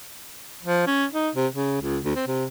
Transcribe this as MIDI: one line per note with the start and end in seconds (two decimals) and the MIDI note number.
0.63 0.86 53
0.87 1.05 61
1.12 1.30 63
1.35 1.47 48
1.54 1.79 49
1.82 1.99 37
2.04 2.15 38
2.16 2.24 60
2.27 2.45 48